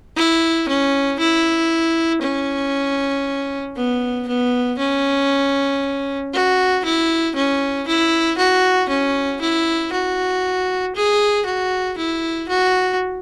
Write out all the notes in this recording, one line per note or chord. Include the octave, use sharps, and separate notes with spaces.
E4
C#4
E4
C#4
B3
B3
C#4
F#4
E4
C#4
E4
F#4
C#4
E4
F#4
G#4
F#4
E4
F#4